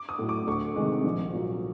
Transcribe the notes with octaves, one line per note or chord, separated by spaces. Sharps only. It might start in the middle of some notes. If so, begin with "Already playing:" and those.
Already playing: D6
D#6
A2 F#3
D6
D2 C#6
C3 D#3 G#3
A#1
A#2 F#3